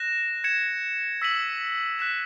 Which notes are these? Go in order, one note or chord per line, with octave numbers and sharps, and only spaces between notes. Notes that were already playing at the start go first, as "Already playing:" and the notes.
Already playing: F#6 A#6 E7
G#6 C#7 E7
E6 B6 D#7 F#7
F#6 B6 E7